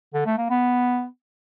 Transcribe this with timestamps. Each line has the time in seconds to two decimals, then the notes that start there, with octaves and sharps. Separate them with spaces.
0.14 D3
0.26 A3
0.38 A#3
0.50 B3